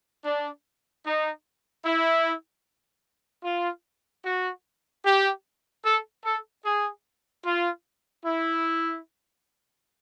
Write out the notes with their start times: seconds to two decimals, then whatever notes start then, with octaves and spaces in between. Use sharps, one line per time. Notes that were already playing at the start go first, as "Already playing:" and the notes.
0.25 D4
1.05 D#4
1.85 E4
3.44 F4
4.25 F#4
5.05 G4
5.84 A4
6.24 A4
6.64 G#4
7.44 F4
8.25 E4